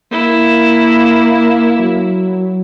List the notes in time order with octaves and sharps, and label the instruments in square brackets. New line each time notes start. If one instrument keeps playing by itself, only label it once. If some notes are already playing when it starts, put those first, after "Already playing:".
[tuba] A#3 [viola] E4
[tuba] F#3